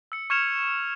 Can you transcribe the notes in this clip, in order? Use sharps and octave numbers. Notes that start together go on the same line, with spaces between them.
E6 C#7
C#6 F6 G#6 C#7 E7 F7